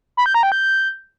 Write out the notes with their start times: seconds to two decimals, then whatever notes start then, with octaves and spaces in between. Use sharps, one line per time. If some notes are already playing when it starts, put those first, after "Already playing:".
0.17 B5
0.26 G6
0.34 A#5
0.43 G5
0.52 G6